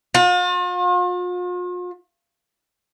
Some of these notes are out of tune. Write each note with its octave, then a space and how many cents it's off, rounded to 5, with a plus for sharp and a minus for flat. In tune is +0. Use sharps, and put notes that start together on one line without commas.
F4 +45